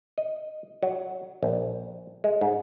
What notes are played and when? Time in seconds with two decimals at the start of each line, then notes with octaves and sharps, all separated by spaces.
0.18 D#5
0.83 F#3
1.43 A#1
2.24 G#3
2.41 G#2